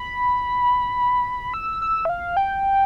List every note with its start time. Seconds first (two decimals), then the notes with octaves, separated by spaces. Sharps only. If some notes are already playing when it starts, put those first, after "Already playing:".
Already playing: B5
1.54 E6
1.82 E6
2.05 E5
2.09 F5
2.37 G5